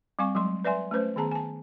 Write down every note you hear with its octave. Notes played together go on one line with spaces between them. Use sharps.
G3 C4 F5 G#5 C#6
F#3 G#3 C6
B4 D5 E5 G#5 C6
A3 C#4 B4 C5
D#3 B3 G#4 A5 A#5
G#5 A5